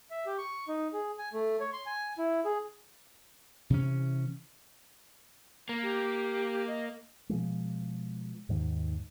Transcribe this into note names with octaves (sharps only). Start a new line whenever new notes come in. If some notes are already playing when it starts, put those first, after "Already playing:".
E5
G4
C#6
D#4
G#4
G#5
A3
C#5
C6
G#5
E4
G#4
C3 E3 C#4
A#3
G4
D#5
B2 F3 G#3
D#2 G#2 D#3